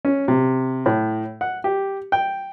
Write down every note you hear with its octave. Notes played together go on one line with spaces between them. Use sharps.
C#4
C3
A2
F#5
G4
G5